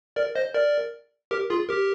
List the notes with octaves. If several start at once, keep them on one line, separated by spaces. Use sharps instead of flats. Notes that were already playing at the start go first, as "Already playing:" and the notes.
A#4 D5
C5 D#5
A#4 D5
G4 A#4
F4 G#4
G4 A#4